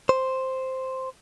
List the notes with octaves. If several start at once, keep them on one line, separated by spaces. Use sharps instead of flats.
C5